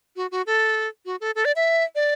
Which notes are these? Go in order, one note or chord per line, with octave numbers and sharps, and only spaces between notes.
F#4
F#4
A4
F#4
A4
A4
D5
E5
D5